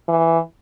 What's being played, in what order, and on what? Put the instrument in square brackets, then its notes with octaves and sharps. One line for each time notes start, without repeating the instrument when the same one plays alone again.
[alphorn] E3